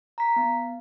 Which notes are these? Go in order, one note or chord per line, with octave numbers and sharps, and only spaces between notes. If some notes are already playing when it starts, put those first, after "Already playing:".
A#5 B6
B3